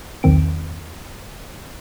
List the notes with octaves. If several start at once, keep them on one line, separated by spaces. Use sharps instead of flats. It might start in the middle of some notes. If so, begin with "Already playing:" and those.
B1 E2 D#3 C4 D7